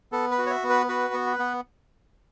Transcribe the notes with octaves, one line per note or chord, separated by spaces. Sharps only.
B3 A4
B4
F#4
C#5
E5
B3
B4
F#4 B4
B3
B4
B3